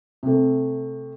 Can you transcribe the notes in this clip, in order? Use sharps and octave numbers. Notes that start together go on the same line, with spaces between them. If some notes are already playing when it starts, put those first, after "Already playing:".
C3 A3